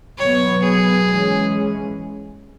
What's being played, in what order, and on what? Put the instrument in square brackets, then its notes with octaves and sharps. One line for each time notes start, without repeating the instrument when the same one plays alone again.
[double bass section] B2 F#3 B3 [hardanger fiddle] C#5
[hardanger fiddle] G#4
[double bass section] E3 G#3 C#4